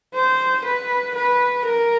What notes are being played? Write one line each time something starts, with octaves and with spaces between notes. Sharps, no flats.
C5
B4
B4
A#4